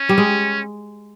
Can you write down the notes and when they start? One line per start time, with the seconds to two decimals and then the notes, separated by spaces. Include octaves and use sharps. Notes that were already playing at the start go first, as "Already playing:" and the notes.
Already playing: C#4
0.09 G3
0.18 G#3